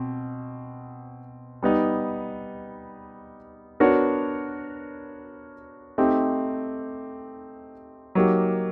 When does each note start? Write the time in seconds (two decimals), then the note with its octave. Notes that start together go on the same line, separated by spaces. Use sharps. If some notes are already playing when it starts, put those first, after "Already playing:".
Already playing: B2 C4
1.63 G3 B3 D#4
3.80 B3 D4 F#4 A#4 C#5
5.98 A3 C4 D#4 G4
8.15 F#3 A#3 D#4 G4